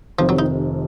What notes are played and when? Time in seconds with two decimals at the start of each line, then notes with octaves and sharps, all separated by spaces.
0.19 F1 F2 C3 D#3 F3
0.29 F#3
0.39 D#4